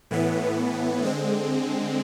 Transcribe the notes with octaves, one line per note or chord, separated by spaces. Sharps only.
A2 E3 B3
D3 G#3 C4